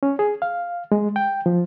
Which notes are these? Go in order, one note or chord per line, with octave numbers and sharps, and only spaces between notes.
C#4
G#4
F5
G#3
G5
F3